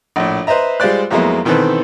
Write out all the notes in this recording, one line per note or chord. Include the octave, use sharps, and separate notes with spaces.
A#1 A2
B4 C5 D#5 E5 A#5
G3 G#3 F4 C5 D5 F#6
F2 F#3 G#3 A#3 B3 E4
B2 D#3 E3 C4 A4 B4